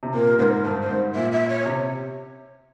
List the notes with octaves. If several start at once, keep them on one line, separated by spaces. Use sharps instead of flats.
C3
A#2 A#4
G#2 A#4 C5
G2 C5
C5
G#2
A#2 E5
E5
C#5
C3